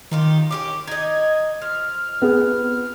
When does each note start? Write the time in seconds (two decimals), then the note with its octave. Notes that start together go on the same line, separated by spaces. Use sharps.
0.11 D#3 D#4 F4 G4
0.51 C#4 E4 G4 D6
0.87 D#4 D#5 G#6
1.62 F3 F6
2.22 B3 G#4